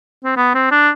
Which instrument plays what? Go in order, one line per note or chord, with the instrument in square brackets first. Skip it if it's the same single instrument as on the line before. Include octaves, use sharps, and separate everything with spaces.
[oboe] C4
B3
C4
D4